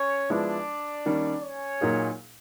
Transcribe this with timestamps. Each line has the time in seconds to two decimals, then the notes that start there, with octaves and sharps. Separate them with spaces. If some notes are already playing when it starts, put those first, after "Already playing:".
Already playing: C#4 C#5
0.29 F3 G#3 B3 D4 E4 D5
1.06 D#3 G3 A#3 C#4
1.43 C#4 C#5
1.81 A#2 F#3 A#3 D#4 G#4